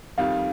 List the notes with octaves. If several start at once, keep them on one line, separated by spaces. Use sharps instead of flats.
F2 D#3 G3 F5